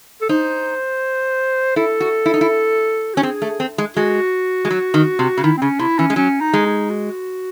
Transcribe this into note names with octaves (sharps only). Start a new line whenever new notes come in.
A4
D#4 C5
E4 A4
F#4
E4
D#4
E4
C#4 F#4
C4 G#4
A3
C4
G#3
G#3 F#4
G#3
F#3
D#3
C3
C#3
D#3 E4
C4
C#3 C#4
C3 E4
E3 C#4
G#3
F#3 C#4
D#4
G#3
D#4
F#4